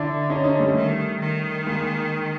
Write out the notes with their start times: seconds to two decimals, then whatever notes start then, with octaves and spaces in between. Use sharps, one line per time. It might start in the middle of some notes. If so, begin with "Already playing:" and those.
Already playing: D3 D4 E4
0.30 C#4 D#4
0.44 C#4 D#4
0.59 G3 A3
0.75 D#3
1.20 D#3
1.66 G#3 A#3